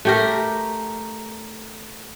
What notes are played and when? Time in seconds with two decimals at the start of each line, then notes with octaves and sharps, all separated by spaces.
0.05 A3 G4 A#4